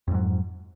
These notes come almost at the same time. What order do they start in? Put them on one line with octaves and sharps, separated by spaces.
F2 G#2 F#3